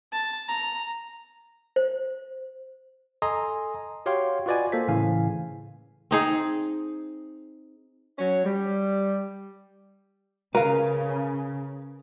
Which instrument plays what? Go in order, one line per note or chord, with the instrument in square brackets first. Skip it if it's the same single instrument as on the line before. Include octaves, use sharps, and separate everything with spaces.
[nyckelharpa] A5
A#5
[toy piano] C5
[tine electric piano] A4 D#5 G#5 A#5 C6 D#6
F#4 G4 C#5 F5 G5 C6
F4 F#4 B4 D5 D#5 G#5
A#3 A4 C5 B6
A2 C#3 E3 F5 G#5
[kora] C4 D#4 G#4
[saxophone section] F#3 C#4 C#5
G3
[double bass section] C#3 [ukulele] A#4 [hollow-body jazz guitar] B4 F5